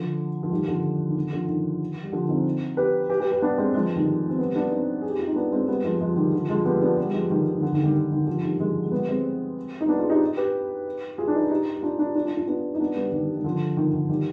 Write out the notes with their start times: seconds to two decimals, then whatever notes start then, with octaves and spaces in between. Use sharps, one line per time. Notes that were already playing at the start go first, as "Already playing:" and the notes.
Already playing: D3 F3
0.43 F3
0.50 D#3 G3
0.68 D3 F3
1.09 D#3
1.16 D3
1.32 D3 F3
1.48 D#3
2.03 G3
2.12 D3 F3
2.29 C4 D#4
2.77 G4 B4
3.09 G4 B4
3.20 G4 B4
3.32 G4 B4
3.42 B3 D4
3.58 G#3 C4
3.74 F3 G#3
3.96 D#3 G3
4.29 C4
4.38 G3 B3
4.55 B3 D4
4.71 C4 D#4
5.01 G#4
5.10 G4
5.19 F4
5.27 D#4
5.35 B3 D4
5.52 G#3 C4
5.68 G3 B3
5.84 F3 G#3
6.01 F3 G#3
6.16 D#3 G3
6.32 D3 F3
6.49 F3 G#3
6.65 G3 B3
6.82 B3 D4
6.98 G3 B3
7.10 G3
7.14 F3 G#3
7.30 D#3 G3
7.52 D#3
7.62 D3
7.73 D#3
7.84 D#3 G3
7.95 D#3
8.11 D#3
8.27 D3 F3
8.43 D#3 G3
8.59 F3 G#3
8.84 G#3
8.91 G3 B3
9.08 G#3 C4
9.81 D#4
9.88 B3 D4
9.99 F4 G#4
10.10 D#4 G4
10.37 G4 B4
11.18 F4 G#4
11.28 D4
11.35 D#4
11.43 F4
11.50 D#4 G4
11.75 G4
11.83 D4 F4
11.98 D4 F4
12.15 D4 F4
12.25 D4 F4
12.37 D4 F4
12.47 B3 D4
12.75 D#4
12.80 B3 D4
12.96 G3 B3
13.12 D#3 G3
13.35 D#3
13.44 D3 F3
13.77 D#3
13.94 D#3
14.09 D#3 G3